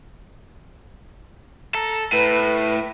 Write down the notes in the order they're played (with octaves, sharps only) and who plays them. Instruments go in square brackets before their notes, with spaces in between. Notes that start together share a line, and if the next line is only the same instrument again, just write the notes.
[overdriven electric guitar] A4 [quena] A#5
[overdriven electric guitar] A2 [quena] B4